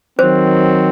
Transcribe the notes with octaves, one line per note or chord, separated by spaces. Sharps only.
D#3 F#3 C4 C5